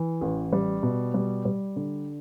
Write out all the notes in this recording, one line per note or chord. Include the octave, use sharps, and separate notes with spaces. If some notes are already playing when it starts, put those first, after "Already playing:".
Already playing: E3
A1
G3
B2
G3
G3
D3